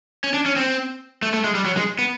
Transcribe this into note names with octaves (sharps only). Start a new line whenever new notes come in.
C#4
D4
C#4
C4
A3
A3
G#3
G3
F#3
G#3
B3